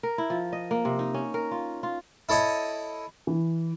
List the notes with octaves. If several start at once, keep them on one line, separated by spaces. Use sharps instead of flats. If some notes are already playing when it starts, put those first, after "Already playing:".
A#4
E4
F3
D#5
A#3
C3
D#4
C#4
A#4
F4
F4
E4 A4 C#5 D#5
E3